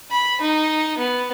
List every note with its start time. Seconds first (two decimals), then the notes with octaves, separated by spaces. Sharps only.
0.10 B5
0.41 D#4
0.98 B3